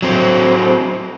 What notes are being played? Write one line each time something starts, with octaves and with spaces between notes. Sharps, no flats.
F#3 C4